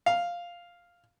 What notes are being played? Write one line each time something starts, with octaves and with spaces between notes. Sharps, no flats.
F5